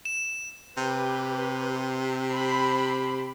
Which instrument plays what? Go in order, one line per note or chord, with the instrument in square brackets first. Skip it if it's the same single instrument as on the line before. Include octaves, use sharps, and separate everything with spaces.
[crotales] E7
[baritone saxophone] C3 [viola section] G4 B4
[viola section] C5 B5